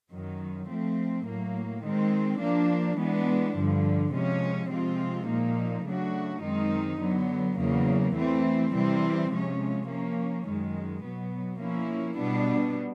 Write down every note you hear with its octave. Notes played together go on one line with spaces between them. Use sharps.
F#2 D#3 F#3
F3 A3 C4
A2 F#3 A#3
D#3 G#3 C4
F3 A#3 D4
E3 G#3 B3 D4
G2 D3 F3
C3 F3 G#3 C#4
C3 F3 G#3 C4 F4
A#2 F3 A#3 D#4
C#3 F#3 A3 D4 F#4
F#2 D#3 G#3 C4 D#4
D3 F#3 B3
E2 C#3 F#3 A#3
E3 A3 C4
C3 E3 G3 C4
C3 F3 G#3 C#4
F3 A#3 C#4
F#2 D#3 G#3
B2 F#3 B3
F3 A#3 C#4 E4
B2 G3 B3 D4